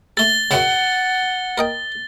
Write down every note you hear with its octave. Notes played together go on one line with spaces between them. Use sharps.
A3 A4 A6 G7
F#2 C#3 F#5
A#4 D#5 G5